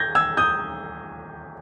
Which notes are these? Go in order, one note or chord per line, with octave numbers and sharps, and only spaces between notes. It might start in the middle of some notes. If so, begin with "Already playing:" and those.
Already playing: G6 G#6 A#6
E6 G#6
D#6 G6